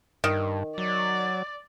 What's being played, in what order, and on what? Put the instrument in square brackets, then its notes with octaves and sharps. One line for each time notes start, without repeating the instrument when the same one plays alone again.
[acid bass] G2 [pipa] D#3
[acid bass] F#3 [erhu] D5